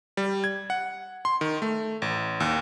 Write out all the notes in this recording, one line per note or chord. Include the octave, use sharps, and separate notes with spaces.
G3
G#6
F#5
C6
D#3
A3
A1
D#2